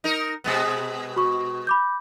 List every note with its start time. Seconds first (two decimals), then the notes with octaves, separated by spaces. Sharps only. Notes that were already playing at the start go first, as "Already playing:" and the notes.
0.04 D#4 A#4
0.44 B2 G#3 B3
1.16 F#4 C#6
1.67 B5 D6 G6